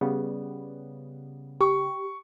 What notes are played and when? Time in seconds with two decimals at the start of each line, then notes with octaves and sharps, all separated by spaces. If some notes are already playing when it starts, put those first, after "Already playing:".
0.01 C#3 G3 B3
1.61 G4 C#6